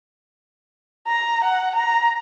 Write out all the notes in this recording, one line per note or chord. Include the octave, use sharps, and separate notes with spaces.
A#5
F#5
A#5